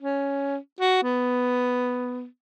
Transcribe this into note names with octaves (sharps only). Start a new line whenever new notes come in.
C#4
F#4
B3